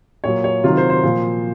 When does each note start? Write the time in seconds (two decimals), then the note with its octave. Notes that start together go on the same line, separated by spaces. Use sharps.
0.24 A#2 F#3 C#5
0.44 C#5
0.64 C3 D#3 F#3 F4
0.77 C5
0.90 C5
1.03 A#2 F3